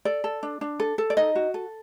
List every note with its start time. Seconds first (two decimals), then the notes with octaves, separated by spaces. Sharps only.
0.05 A4 D5
0.24 A4
0.43 D4
0.61 D4
0.80 A4
0.98 A4
1.10 D5
1.17 D#4 D#5
1.35 F#4
1.54 A4